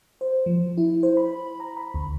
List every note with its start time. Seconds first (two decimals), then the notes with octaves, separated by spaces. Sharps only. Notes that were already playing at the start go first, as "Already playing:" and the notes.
0.21 C5
0.46 F3
0.77 E4
1.03 C5
1.17 B5
1.60 A#5
1.77 B5
1.94 D2